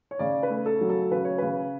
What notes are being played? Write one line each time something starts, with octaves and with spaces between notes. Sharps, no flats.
C#5
C#3 D5
B4
A3
A4
F#3
A4
C#3 B4
C#5
C#3 B4